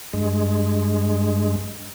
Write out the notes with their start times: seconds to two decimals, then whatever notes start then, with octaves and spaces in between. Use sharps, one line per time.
0.13 G2 G#3